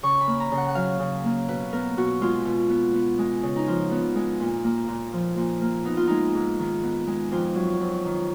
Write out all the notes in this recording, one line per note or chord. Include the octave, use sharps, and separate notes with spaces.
C#3 C#6
B5
A#3
A#5
C#3
F#5
F#5
F#3 F5
C#3
A#3
B2 B4
B3 A#4
B2 F#4
G#3 F4
B2
B3
B3
G#3
C#3
D#4
F3 F4
B3
G#3
A#2
A#3
A#2
F3
A#2
A#3
B3 D#4
F4
G#3 D#4
G#2
D#3
B3
G#3
F2 F4
F#3
F2
D#3